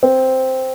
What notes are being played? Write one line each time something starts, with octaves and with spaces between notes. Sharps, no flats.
C4